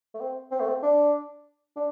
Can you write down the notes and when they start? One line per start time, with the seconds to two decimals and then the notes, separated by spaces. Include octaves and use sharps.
0.14 A3
0.21 C4
0.52 C4
0.61 A3
0.69 C4
0.83 D4
1.76 D4